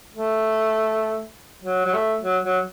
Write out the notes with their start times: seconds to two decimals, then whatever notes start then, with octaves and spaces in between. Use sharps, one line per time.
0.13 A3
1.64 F#3
1.85 F#3
1.94 A3
2.24 F#3
2.44 F#3